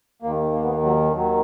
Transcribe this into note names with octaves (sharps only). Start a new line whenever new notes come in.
D#2 D#3 A#3
A#3
B3
A#3
F#3
D#2 D#3 F#3